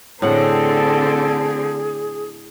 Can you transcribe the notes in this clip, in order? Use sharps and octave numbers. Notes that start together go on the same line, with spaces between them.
A2 D3 C4 G#4 A4 F#5 A5